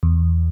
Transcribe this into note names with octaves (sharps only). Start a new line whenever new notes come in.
E2